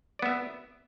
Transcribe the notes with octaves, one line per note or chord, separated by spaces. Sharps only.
B3 D5 E5